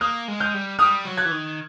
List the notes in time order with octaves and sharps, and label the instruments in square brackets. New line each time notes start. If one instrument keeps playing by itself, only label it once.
[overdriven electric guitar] A#3 [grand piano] D#6 F6
[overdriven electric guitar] G#3
[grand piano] F6 G6
[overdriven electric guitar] G3
[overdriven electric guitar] G3 [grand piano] D#6 F6
[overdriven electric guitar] F#3
[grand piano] F#6 G#6
[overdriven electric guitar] E3
D#3